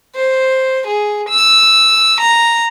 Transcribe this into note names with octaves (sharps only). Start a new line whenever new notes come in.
C5
G#4
E6
A#5